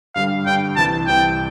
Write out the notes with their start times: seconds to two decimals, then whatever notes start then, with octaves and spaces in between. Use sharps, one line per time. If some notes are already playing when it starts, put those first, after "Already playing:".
0.15 G2 D3 G3 F5
0.46 G2 D3 G3 G5
0.76 C2 C3 E3 A5
1.07 C2 C3 E3 G5